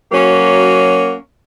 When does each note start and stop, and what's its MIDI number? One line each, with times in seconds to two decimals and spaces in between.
0.12 1.14 54
0.12 1.14 58
0.12 1.14 61
0.12 1.14 66